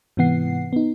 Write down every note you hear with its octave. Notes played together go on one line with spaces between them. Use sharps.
G#2 C3 E3 B3 F#5 C7
B3 D#4